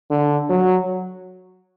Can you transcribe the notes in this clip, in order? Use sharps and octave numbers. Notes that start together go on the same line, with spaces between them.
D3
F#3